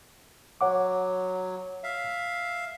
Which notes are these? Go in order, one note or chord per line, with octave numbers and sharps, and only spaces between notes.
F#3 C#5 F#5 D6
E5 F5